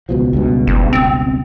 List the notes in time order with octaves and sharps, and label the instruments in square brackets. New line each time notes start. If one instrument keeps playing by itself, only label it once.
[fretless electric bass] C#2 B2 F3
C#2 G2 B2
[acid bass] F#1
C4